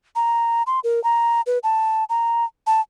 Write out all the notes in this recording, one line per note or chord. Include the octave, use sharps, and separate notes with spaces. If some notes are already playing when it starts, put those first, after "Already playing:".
A#5
C6
A#4
A#5
B4
A5
A#5
A5